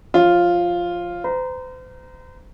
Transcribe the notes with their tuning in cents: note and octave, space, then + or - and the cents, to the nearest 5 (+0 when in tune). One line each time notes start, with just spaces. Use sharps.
F3 +0 F4 +0 C#5 -35
C5 -40 A#5 +5